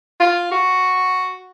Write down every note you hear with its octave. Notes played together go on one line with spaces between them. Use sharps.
F4
F#4